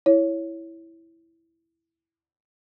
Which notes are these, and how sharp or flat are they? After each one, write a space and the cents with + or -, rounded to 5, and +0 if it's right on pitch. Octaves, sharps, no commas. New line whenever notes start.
E4 +0 C#5 +0